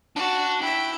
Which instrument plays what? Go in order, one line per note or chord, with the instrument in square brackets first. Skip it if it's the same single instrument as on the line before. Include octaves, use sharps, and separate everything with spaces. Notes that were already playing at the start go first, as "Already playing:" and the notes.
[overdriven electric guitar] D4 A5 [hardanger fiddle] F#4
[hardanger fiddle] E4 E5 [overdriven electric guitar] G5